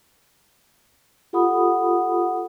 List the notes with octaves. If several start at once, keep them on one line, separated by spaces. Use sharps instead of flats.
F4 G4 A4 F#5 B5 D#6